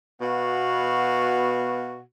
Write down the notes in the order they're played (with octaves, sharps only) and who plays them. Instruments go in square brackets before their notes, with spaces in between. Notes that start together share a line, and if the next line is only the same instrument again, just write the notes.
[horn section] B2 B3 F#4 F5